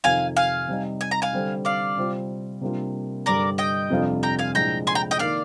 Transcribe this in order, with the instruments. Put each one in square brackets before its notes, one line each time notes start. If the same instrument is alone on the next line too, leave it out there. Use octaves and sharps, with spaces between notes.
[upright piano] F2 C3 D#3 [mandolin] F5 G#5
[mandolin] F5 G#5
[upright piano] C3 G3 C4 D#4
[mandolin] G#5
A#5
F5 G#5
[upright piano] D3 G3 C4
[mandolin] D5 F5
[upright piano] C3 G3 C4 F4
C3 G3 A#3 D4 F4
[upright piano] G2 D3 G3 [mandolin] A#4 D5
[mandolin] D#5 G5
[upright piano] F2 C3 G3 D4 F4
[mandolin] G5 A#5
F5 G#5
[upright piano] C2 A#2 F3 G#3 D4 [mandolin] G5 A#5
[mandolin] G#5 C6
G5 A#5
D#5 G5
[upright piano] D#3 A#3 [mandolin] D5 F5